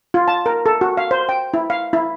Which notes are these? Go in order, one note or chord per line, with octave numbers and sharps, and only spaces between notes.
F4
A5
A#4
A4
F#4
F5
C5
G5
E4
F5
E4